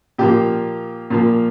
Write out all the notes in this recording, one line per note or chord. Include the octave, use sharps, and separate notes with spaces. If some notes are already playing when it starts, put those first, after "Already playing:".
A#2 F3 A#3 G4
A#2 F3 A#3